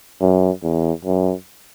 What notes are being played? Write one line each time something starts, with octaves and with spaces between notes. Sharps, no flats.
F#2
E2
F#2